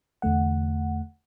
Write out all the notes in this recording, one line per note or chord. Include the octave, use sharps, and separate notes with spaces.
E2 D3 A3 F#5